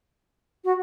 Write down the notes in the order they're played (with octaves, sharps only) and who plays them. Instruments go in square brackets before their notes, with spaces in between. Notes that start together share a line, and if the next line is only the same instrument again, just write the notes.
[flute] F#4